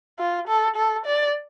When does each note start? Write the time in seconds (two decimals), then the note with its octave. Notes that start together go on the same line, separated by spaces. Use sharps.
0.19 F4
0.48 A4
0.76 A4
1.06 D5